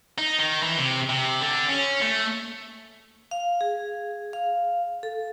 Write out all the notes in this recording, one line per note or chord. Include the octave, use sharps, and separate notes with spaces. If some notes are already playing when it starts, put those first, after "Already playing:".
D#4
D#3
E3
C3
C3
D3
C#4
A3
F5
G#4
F5
A4